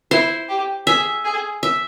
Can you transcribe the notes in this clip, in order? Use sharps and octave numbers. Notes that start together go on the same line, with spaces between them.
E4 C5
G4
G#4 E5
G#4
E5